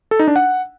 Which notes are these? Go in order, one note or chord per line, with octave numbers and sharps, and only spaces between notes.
A4
D#4
D4
F#5